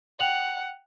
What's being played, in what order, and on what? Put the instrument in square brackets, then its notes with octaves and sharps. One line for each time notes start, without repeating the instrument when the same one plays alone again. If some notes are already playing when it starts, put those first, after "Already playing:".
[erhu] F#5 [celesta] G5 F7 F#7